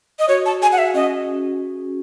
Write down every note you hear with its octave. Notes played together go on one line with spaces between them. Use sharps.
D#5
F#4 C#5
A5
G#4 G#5
F#5
E5
C#4 D#5